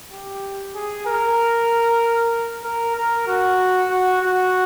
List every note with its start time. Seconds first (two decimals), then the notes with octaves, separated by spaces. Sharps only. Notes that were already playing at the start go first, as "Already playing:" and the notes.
0.11 G4
0.75 G#4
1.06 A#4
2.64 A#4
2.96 A#4
3.27 F#4
3.90 F#4
4.22 F#4